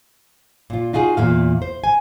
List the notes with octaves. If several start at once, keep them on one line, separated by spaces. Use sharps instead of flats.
A#2 F4
D#4 F4 F#4 G#4
E2 A#2 F5
C5
G#5